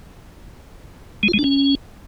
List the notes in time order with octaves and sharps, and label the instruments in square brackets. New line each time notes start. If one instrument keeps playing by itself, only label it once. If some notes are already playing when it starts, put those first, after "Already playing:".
[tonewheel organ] G#3
F4
G#3
D4
C#4